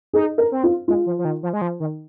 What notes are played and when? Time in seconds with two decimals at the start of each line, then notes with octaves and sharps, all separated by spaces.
0.13 D#4 G#4
0.38 A#4
0.52 C4
0.64 F4
0.88 G#3 F4
1.06 F3
1.19 F3
1.25 D#3
1.43 F3
1.53 G#3
1.62 F3
1.80 D#3